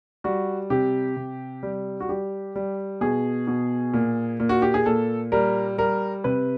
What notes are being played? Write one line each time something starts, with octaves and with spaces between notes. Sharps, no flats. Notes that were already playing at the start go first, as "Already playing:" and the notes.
G3 F#4
C3 G4
C3
G3
F#4
G3 G4
G3
B2 G#4
B2
A#2
A#2
F#4
G4
G#4
A#2 A4
G3 A#4
G3 A#4
C3 B4